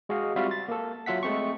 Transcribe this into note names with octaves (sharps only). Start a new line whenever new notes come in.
G#3 F#4 G#4 D#5 F5
G3 C4 F4 F#4 E5 F5
A6
A#3 A4
F#3 F4 E5 F#5 B6
G#3 A3 C4 C#6